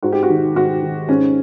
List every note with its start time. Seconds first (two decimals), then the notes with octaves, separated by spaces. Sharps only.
0.02 G#2 F#4
0.12 G4
0.23 F#4
0.29 D#3
0.56 G#2 F#4
0.82 D#3
1.08 G#2 C#4